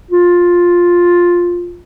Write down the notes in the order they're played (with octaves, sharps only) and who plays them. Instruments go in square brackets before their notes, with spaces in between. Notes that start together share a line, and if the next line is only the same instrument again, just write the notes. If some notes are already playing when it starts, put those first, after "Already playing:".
[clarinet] F4